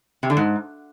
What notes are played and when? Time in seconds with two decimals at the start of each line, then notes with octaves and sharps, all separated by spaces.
0.23 C3
0.30 D3
0.37 G#2